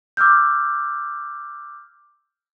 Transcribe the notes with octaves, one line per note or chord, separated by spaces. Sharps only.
D6 E6 F6 G6